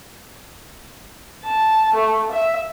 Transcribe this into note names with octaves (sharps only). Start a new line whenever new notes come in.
A5
A3
E5